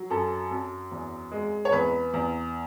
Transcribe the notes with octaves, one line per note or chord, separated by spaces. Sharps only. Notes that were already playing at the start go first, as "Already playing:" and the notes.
Already playing: F#3
F#2 A4
F#2
E2
G#3
C#5
E2 B4
E2